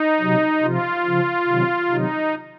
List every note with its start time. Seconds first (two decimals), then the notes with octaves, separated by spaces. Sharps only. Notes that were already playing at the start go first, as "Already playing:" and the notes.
Already playing: D#4
0.20 C3 F#3
0.63 C3 F3 F4
1.05 C#3 F3
1.48 C3 D#3 F#3
1.90 C3 D#3 F#3 D#4